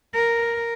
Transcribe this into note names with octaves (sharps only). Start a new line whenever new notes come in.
A#4